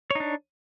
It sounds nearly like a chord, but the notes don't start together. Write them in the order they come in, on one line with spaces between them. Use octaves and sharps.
C#5 D#4 D4